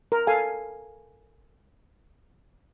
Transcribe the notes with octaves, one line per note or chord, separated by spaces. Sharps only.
A#4
A4 F5 G#5